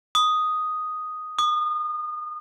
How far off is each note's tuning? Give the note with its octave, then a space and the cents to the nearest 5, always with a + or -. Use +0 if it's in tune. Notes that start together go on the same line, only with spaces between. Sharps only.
D#6 +0
D#6 -30